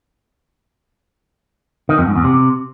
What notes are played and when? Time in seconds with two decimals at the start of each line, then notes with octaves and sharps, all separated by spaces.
1.89 D#3
1.98 F2
2.07 G#2
2.15 E2
2.24 C3